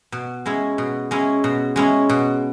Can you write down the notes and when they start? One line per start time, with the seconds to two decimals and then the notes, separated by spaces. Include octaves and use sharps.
0.12 B2
0.46 G#3 C#4 E4
0.78 B2
1.11 G#3 C#4 E4
1.44 B2
1.76 G#3 C#4 E4
2.09 B2